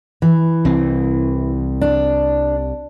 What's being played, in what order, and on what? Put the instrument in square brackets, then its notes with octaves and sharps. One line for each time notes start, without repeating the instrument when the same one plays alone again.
[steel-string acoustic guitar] E3
[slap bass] C2 C4
[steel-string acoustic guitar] D4